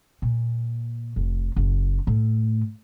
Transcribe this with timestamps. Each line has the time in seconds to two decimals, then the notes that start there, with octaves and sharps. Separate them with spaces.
0.22 A#2
1.16 F1
1.56 F#1
2.07 A2